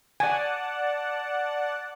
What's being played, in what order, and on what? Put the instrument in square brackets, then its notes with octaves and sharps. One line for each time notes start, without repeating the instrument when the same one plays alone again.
[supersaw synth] D5 F#5 A5 [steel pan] G#5